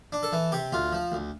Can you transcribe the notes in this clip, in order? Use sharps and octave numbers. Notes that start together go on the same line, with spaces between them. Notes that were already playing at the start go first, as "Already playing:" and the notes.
D4
A4
E3
C3 G4
D2 F4
F3
D2